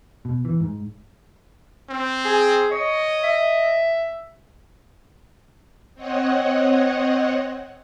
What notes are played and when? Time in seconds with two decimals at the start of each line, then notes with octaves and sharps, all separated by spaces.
0.25 B2
0.45 E3
0.60 G#2
1.89 C4
2.25 G#4
2.71 C#5 D#5
3.24 E5
5.95 C4 C#5 D#5 F#5